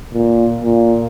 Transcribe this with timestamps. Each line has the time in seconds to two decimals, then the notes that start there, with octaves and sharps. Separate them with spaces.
0.14 A#2
0.62 A#2